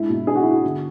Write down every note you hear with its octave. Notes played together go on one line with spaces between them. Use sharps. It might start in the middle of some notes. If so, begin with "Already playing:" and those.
Already playing: G#3 D4 E4
B2
D4 G#4
F#4
B3 E4
F#4
D3